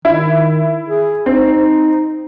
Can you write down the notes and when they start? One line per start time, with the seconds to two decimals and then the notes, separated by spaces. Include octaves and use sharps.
0.05 D#3 E4
0.89 G#4
1.26 C4 D#4